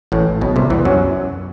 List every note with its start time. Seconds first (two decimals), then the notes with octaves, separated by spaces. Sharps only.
0.12 A1 A2
0.41 B1 B2
0.56 C2 C3
0.70 E2 E3
0.85 F#2 F#3